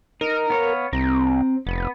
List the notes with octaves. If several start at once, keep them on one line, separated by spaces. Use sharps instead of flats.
D#4 A#4
B3 C#5 F5
C2 C4 A#5
F1 B3